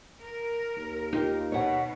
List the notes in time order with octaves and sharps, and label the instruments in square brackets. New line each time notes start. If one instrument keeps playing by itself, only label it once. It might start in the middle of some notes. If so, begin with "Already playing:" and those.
[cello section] A#4
[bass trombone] D#2
[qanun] D#4 [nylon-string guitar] F4 G4
[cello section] B2 [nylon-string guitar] C#5 F#5